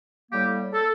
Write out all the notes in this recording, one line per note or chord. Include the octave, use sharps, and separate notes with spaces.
A2 G3 A#3 G4
A4